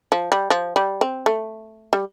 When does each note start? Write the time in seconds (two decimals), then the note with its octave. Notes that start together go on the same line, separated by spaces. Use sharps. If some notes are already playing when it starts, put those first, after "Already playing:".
0.12 F3
0.32 G3
0.50 F3
0.76 G3
1.01 C4
1.26 A3
1.93 G3